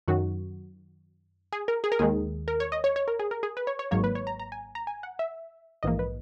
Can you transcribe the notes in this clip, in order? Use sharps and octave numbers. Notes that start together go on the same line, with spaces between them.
F#2 D#3 F#3 F#4
G#4
A#4
G#4
A#4
D#2 D#3 G#3 G#4
A#4
C#5
D#5
C#5
C#5
A#4
G#4
A#4
G#4
B4
C#5
C#5
G#1 G#2 F#3 A#3 C#5
B4
C#5
A#5
A#5
G#5
A#5
G#5
F#5
E5
A#1 G#2 E3 A#3 D#5
B4